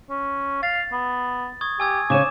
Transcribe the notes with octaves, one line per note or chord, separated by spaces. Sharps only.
C#4
F5 A6
B3
C#6 D#6 G#6
G4 G#5 E6 G#6
C#3 C#5 G#5 D6 E7